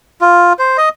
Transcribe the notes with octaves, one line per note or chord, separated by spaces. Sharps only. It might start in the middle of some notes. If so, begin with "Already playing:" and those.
F4
C5
D#5